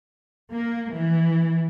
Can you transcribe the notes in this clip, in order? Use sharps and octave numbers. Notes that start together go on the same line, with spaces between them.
A#3
E3